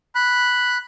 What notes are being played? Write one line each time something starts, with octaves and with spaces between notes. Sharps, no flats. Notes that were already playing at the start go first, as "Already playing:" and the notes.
B5 F#6